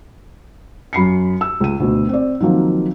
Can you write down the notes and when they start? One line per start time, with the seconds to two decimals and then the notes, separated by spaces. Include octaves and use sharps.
0.93 F#2 B5 C7 C#7
1.41 E6
1.60 C#2 D#7
1.80 D2 B2
2.09 C4 D5
2.40 D#3 F3 F#3 A#3 C4